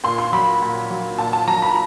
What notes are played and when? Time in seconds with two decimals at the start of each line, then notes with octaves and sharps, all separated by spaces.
0.04 A#2 C6
0.18 C6
0.33 F#3 B5
0.62 A#2
0.90 F#3
1.19 A#2 A5
1.33 A5
1.47 F#3 A#5
1.62 B5